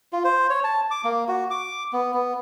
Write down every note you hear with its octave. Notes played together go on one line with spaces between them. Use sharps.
F4
C5
C#5
A5
D6
A#3
F#4
D6
B3
B3